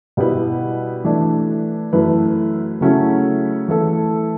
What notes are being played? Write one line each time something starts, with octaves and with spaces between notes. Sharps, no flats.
B2 G3 B3 E4 B4
E3 A3 D4
F#2 E3 A3 E4 B4
C#3 F#3 A3 C#4 E4
E3 A3 E4 A4